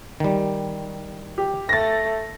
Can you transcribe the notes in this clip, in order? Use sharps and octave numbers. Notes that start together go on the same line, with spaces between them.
D#3 G3
G4
A3 A6 A#6